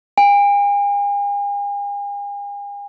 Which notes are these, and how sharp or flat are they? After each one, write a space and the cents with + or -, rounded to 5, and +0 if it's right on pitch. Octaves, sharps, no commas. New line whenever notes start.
G#5 -45